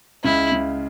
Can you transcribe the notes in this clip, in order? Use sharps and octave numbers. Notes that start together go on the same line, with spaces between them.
C#2 C#3 E4
C#2 C#3